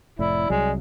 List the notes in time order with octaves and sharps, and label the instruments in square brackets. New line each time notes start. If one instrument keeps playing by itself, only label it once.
[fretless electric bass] F1 A2 [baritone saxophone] E4 [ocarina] D5
[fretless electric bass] C2 F#3 [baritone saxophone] G#3